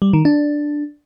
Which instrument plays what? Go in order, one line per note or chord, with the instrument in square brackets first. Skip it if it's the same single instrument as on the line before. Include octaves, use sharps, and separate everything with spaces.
[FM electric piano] G3
D#3
D4